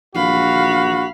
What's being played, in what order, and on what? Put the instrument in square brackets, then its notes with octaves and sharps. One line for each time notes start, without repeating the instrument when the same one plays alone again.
[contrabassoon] A#1 [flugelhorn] F#4 [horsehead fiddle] F5 B5